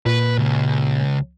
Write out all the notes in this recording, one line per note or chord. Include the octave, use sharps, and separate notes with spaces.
A#2 B4
C#2